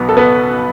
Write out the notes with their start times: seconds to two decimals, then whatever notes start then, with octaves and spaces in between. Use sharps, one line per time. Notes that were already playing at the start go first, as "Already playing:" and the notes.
Already playing: B1 B2 B3
0.09 A4
0.17 B3 B4